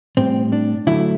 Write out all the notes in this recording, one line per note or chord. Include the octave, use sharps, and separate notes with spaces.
A2 G3 C4
D4
D3 F#3 A3 E4